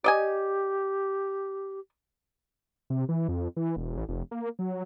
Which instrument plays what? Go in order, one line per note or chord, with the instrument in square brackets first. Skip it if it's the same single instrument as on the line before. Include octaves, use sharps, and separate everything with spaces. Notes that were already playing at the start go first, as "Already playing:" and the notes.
[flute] G4 [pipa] D5 D#5 G#5
[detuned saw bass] C3
E3
F2
E3
E1
A1
F1
A#3
F#3